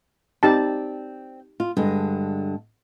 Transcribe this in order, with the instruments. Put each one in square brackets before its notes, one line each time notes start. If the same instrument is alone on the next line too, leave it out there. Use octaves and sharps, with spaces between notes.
[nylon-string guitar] C4 D5 [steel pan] D#4 G4 A5
[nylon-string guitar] F4
G2 D3 G#3